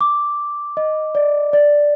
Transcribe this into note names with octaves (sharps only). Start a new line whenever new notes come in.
D6
D#5
D5
D5